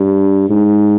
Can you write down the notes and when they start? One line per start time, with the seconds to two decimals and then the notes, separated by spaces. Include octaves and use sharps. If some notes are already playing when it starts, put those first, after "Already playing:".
Already playing: G2
0.50 G#2